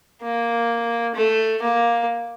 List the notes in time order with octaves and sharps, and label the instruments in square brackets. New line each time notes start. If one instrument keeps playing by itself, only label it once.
[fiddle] A#3
A3
A#3